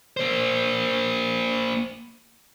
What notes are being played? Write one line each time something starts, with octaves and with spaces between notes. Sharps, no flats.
A#3 C5